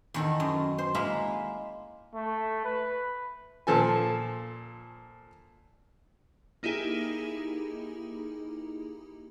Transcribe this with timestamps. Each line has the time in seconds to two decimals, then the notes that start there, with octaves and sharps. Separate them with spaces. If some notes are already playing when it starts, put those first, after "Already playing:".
0.14 E2 D#3 A4
0.40 F#2
0.78 C5
0.95 G#3 A#3 E4 E5
2.15 A3
2.65 B4
3.67 A#2 F3 A4 G#5
6.63 A#3 D#4 E4 G4 G#4